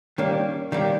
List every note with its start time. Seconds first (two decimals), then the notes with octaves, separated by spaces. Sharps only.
0.18 D#3 G3 A#3 C#4
0.72 D#3 G3 A#3 D4